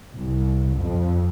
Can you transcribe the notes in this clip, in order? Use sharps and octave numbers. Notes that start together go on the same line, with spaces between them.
C2
F2